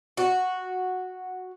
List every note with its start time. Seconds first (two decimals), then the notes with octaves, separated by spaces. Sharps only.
0.17 F#4